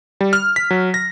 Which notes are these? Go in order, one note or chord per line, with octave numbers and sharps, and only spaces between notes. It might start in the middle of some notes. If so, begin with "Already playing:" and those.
G3
F6
B6
F#3
A#6